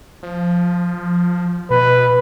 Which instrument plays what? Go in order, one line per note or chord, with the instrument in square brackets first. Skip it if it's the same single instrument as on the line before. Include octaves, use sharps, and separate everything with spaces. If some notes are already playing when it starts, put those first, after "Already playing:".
[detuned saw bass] F3
[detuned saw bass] B2 [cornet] B4